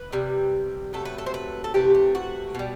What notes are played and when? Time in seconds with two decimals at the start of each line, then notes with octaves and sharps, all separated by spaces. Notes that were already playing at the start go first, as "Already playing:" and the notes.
Already playing: B4
0.12 C3 G3
0.93 C3 F#3 A3 A4
1.05 B4
1.18 A4
1.26 C5
1.34 B4
1.64 A4
1.74 C3 E3 A3 G4
1.95 G4
2.15 F#4
2.55 B2 G3